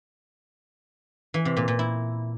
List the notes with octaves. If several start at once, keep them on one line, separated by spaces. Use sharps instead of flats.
E3
C3
A#2
A#2
E4